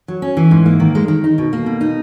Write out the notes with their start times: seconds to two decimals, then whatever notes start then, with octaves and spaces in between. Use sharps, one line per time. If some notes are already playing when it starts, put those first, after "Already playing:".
0.08 F#3
0.22 C#4
0.37 E3
0.51 G#2
0.66 A#3
0.80 D#3
0.95 G#3
1.08 D#3
1.24 D#4
1.38 B2
1.53 A#3
1.66 B2
1.81 D#4